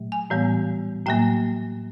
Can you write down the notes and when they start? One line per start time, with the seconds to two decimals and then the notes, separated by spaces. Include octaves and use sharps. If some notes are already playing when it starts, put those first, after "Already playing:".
Already playing: A#2 F#3 A3
0.12 G#5
0.30 A2 E3 G3 B3
1.06 A2 F#3 A#3 G5